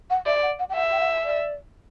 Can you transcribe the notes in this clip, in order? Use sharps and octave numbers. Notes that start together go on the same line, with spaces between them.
F#5
D5 E5
F#5
F#5
G5
E5 F#5
G5
F#5
D5